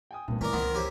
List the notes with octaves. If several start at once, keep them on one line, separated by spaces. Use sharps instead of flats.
G5 G#5 D#6
G#1 G2 A#2 A3
E3 G#3 A3 C#4 A#4 D5
C#2 D#3 B3 C4 F#5
E4 G4 C5 C#5 G#5